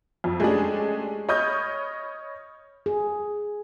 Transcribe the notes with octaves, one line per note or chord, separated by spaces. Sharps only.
F2
G#3 A3 C#4 D4 G4 G#4
C#5 D#5 B5 D#6 F6 G6
G#4